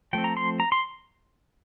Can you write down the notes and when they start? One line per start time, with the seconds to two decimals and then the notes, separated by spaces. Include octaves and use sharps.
0.13 F3 A3 C4 G5
0.24 A#5
0.37 C6
0.60 A#5
0.72 C6